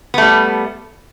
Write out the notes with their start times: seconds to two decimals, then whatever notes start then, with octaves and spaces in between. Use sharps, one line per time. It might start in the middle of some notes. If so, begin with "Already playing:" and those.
0.14 B3
0.18 A3
0.22 G3